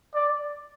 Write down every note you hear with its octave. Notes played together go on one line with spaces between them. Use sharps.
D5